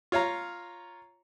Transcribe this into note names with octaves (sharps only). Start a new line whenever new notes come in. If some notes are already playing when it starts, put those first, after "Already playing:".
F4 C#5 F5 A#5